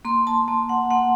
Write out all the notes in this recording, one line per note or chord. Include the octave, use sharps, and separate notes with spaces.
A#3 C6
A5
A#3 A5
F#5
A#3 F#5